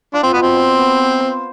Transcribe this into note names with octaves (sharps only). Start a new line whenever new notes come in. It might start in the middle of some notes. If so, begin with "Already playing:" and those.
D4 F4
C4
B2 B3
C4
C5
B3
C5
C5